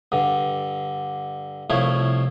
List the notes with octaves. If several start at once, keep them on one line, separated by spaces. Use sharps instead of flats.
G2 D3
C2 F3 A3 E4 C#5